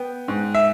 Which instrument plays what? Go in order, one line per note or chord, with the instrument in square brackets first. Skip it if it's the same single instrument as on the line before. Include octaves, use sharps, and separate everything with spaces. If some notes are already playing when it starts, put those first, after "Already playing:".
Already playing: [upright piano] B3 G5
G#2
E5